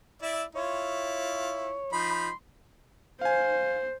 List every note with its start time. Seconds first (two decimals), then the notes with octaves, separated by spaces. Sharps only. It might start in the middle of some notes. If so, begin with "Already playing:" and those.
0.22 E4 D5 E5
0.55 E4 F4 C#5
1.93 F3 D#4 B5 C6
3.21 C5 F5 G#5